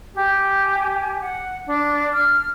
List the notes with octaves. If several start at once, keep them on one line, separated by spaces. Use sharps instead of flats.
G4 G#5
F#5
D4
F6